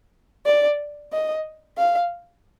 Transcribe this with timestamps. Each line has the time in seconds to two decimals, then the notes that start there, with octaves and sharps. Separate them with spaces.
0.46 D5
1.13 D#5
1.78 F5